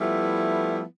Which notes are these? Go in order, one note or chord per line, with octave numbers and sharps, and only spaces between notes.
F3 G3 A3 B3 E4